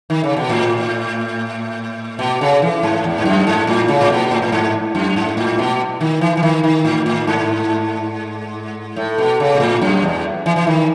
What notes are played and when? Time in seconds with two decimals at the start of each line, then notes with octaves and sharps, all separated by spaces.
0.10 D#3
0.24 C#3
0.37 B2
0.49 A2
2.19 B2
2.41 C#3
2.62 E3
2.83 G#2
3.04 E2
3.18 G#2
3.25 F#2
3.47 G#2
3.67 A2
3.88 C#3
4.01 A2
4.10 B2
4.31 A2
4.42 A2
4.52 G#2
4.95 F#2
5.16 G#2
5.37 A2
5.59 B2
6.01 D#3
6.21 E3
6.37 E3
6.43 D#3
6.64 D#3
6.85 A2
7.06 A2
7.27 G#2
8.96 A2
9.18 B2
9.40 C#3
9.55 B2
9.60 A2
9.82 F#2
10.02 E2
10.46 E3
10.56 E3
10.67 D#3